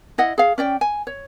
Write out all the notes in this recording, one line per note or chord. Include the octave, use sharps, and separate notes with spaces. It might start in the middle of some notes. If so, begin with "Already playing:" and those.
E4 D#5 F#5
G#4 F5
C#4 D5 G5
G#5
C#5